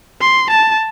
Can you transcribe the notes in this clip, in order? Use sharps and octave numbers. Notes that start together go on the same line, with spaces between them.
C6
A5